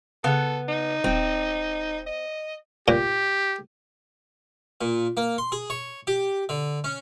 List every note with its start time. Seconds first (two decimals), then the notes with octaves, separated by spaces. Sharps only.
0.24 C#3 B3 A4
0.68 D#4
1.04 D#1 C4
2.06 D#5
2.88 A#2 G4
4.81 A#2
5.17 A#3
5.38 C6
5.52 G#4
5.70 C#5
6.07 G4
6.49 D3
6.84 C#4